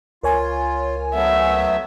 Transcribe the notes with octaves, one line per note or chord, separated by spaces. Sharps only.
C#2 F4 A#4 C#5 G#5
F#3 A3 B3 E5